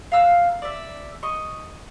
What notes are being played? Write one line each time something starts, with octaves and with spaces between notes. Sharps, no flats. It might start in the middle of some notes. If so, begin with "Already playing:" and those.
F5 A#5 E6 F#6
D5 E5
D#5 C#6